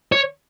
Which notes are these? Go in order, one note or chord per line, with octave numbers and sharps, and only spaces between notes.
C#5